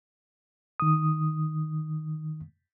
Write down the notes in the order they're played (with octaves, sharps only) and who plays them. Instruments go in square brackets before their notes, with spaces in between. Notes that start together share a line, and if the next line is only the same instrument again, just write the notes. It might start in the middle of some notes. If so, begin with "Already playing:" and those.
[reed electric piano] D#3 D#6